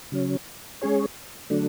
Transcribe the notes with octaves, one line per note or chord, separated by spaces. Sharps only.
C#3 F#3 C#4
G#3 C#4 G#4 C#5
D3 F#3 A3 D4